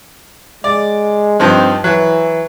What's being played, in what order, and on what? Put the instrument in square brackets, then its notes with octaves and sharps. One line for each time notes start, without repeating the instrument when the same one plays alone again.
[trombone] G#3 [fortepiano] D5
[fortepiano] G2 F3 D#4 [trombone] C4
[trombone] E3 [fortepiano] F#3